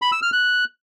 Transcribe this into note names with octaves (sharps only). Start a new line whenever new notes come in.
B5
E6
F6
F#6